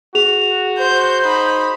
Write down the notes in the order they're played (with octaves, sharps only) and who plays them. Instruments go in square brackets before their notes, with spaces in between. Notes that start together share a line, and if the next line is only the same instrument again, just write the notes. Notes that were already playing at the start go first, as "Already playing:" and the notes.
[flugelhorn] F#4 [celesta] G#4 F7
[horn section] C5 [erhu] G6
[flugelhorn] D#4 [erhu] B5